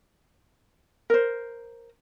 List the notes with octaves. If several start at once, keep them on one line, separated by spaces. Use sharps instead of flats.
A#4 C5